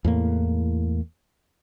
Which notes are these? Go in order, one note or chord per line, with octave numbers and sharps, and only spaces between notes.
E2 A2 A#3